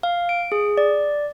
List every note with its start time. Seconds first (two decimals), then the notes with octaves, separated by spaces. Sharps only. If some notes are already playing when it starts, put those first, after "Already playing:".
0.03 F5
0.29 D7
0.52 G#4
0.77 D5